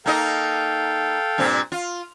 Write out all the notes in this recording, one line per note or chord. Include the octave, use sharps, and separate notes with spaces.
A#3 D#4 A4 D#5 F5 G5
G2 A#2 C4
F4